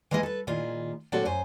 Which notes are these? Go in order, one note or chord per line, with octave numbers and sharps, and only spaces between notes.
E3 G#3 A#3 G#4 D#5
A4 B4
A#2 D#3 E4 F4 G#4
A#2 F#3 C4 D4 F#4 A4
F#2 C5 G#5